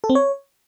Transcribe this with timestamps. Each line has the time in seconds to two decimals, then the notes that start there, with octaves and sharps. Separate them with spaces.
0.04 A4
0.10 C4
0.15 C#5